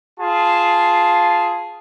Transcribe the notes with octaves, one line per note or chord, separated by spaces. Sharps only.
F4 G#4 A5